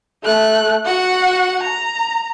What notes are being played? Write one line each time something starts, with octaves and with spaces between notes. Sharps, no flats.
A3 F#6
F#4 F#5
A#5